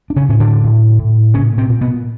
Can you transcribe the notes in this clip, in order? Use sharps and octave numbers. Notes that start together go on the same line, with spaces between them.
D4
C#3 C#4
A2 C#4
D3 D4
A2
A2
A#2 C#3 C#4
C3 C4
A#2
B2 B3